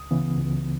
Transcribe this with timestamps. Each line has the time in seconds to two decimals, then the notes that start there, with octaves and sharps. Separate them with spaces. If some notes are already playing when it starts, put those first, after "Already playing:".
Already playing: C#2 D#6
0.11 C#3 E3 B3
0.38 C#2